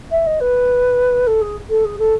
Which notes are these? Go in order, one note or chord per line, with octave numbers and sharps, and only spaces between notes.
E5
D#5
B4
A4
G#4
A4
G#4
A4